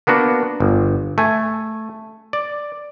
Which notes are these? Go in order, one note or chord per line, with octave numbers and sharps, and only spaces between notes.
A#3 B3 D4 F#4
G1
A3 G#5
D5